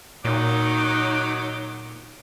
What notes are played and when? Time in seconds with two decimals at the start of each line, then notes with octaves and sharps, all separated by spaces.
0.25 A#2 D#3 F#3 D#4 D6